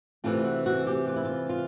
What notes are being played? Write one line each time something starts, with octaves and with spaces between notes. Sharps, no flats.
C3 E3 A3 C4 F4
F#4
F#4
G4
F4
E4
F4
F4